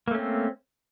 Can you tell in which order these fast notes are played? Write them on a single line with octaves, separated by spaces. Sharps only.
A#3 A3 C#4 C4